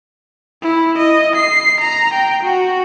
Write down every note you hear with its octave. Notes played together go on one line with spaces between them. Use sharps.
E4
D#5
C7
A#5
G5
F#4